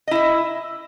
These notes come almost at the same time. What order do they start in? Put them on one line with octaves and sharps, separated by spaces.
D#5 E4 E5